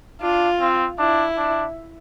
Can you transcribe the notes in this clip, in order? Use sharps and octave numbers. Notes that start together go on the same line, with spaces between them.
D4 F4
C4
D4 E4
D4